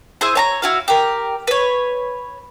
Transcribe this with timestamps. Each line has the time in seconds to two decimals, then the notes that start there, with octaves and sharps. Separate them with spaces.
0.21 E4 G#4 C5
0.35 C#5 A5 A#5
0.62 E4 F#4 F5
0.88 G4 A#4
1.47 B4 C#5